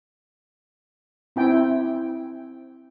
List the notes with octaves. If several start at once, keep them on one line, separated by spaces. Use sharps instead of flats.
C4 E4 G5